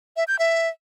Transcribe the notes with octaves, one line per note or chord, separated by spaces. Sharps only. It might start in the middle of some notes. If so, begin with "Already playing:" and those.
E5
G6
E5